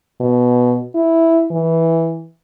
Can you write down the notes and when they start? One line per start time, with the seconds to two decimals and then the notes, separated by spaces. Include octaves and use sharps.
0.20 B2
0.95 E4
1.51 E3